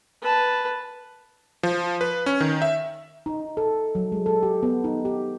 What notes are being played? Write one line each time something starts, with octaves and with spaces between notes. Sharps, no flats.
B4 A5
F3
B4
C#4
D#3
E5
D#4
A4
F#3
G#3
A4
G4
B3
D#4
G4